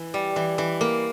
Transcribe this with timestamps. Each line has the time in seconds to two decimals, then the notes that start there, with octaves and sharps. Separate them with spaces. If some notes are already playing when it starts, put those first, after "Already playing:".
Already playing: E3
0.14 G3
0.36 E3
0.58 E3
0.81 A#3